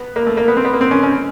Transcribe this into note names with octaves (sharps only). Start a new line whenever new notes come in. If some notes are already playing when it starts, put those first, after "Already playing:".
Already playing: B3
A#3
A3
A#3
B3
C4
B3
A#3
C4
C#4
C#4